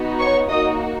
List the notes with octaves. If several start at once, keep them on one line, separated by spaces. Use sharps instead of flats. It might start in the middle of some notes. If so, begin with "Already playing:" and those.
Already playing: B3 D#4 F#4
C#5 C#6
A#3 D#4 F#4 D#5 D#6